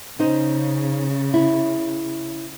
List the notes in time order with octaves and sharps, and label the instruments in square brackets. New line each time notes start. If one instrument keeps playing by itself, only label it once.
[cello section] C#3 [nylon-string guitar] C#4 D#4 C5
[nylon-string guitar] E4